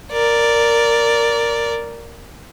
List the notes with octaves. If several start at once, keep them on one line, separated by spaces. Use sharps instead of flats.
A#4 D5